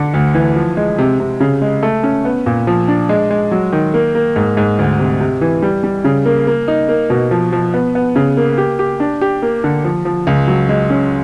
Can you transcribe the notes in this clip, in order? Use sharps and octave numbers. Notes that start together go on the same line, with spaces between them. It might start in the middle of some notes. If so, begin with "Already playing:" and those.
Already playing: D3
D2
E3
F3
G#3
C3
C3
C#3
G#3
A3
C#4
B3
A#2
F3
D4
G#3
G#3
F#3
D#3
A#3
A#3
G#2
G#2
D2
C3
C3
E3
G3
G3
C#3
A#3
A#3
D#4
A#3
B2
F3
F3
B3
B3
C#3
A#3
G4
G4
D4
G4
A#3
D3
F3
F3
C#2
F#3
G#3
C#4